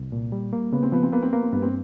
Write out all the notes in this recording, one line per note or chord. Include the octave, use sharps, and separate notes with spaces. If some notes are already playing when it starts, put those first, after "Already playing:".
Already playing: C2
A#2
G3
A#3
C#3 B3
C4
F3 B3
C4
A#3 B3
C4
A#3 B3
C4
G2 B3
C4